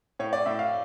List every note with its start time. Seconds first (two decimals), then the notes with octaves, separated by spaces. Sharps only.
0.19 A2 C#5
0.33 D5
0.46 A2 E5
0.59 F5